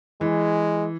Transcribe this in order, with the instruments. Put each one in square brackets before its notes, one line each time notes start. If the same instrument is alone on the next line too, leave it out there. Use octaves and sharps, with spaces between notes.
[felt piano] E3 [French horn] G#3